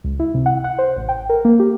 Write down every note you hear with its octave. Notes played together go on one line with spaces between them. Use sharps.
C#2
E4
C3
F#5
F#5
C5
A1
G5
A#4
A#3
G4